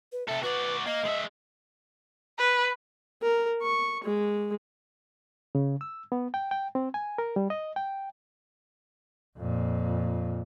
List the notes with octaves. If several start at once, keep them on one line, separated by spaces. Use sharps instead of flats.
B4
C3 A4 E5
F#4 B4 D5
A#3 D#5
G#3 E5
B4
A#4
C#6
G#3
C#3
E6
B3
G5
G5
C4
G#5
A#4
G3
D#5
G5
F2 A#2